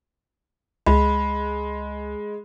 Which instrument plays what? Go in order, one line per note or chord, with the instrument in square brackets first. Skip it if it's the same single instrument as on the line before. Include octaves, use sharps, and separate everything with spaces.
[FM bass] C#2 [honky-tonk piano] G#3 [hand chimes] B5